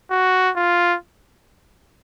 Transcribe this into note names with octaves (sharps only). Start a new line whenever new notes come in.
F#4
F4